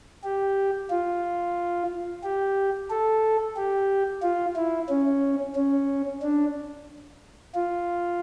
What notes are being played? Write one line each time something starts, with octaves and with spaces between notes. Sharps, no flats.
G4
F4
G4
A4
G4
F4
E4
C#4
C#4
D4
F4